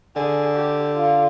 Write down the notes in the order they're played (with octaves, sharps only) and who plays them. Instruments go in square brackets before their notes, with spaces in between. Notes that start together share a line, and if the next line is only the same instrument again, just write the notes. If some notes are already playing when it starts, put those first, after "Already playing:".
[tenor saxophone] D3 [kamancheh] G#4
[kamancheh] G4
F4